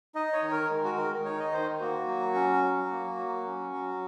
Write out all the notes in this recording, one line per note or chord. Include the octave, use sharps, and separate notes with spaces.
D#4 D#5
C#5
D#3
A#4
G#3
F#4
D#3 A#4
D#4 C#5
D#5
D#3 C5
A#3 F#4
F#3
C#4
F#3
A#3
F#3
C#4
F#3